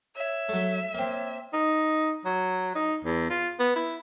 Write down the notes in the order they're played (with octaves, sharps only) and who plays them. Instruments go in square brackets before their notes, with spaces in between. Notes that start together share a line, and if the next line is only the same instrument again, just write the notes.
[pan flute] C#5 [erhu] E5
[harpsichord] F#3 A3
[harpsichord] A#3 C4 [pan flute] C#5
[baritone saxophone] D#4
F#3
D#4
E2
F4
B3
E4